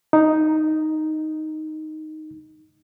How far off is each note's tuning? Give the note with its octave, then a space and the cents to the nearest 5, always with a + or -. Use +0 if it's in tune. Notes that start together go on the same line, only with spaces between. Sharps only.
D#4 +0